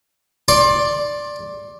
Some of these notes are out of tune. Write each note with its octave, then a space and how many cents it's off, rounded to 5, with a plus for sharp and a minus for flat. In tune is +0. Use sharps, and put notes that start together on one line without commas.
D5 +0 C6 +30